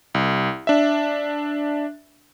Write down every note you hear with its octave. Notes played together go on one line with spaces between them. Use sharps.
C2
D4 E5